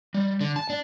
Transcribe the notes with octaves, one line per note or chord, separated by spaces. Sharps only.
G3
D3
A5
D4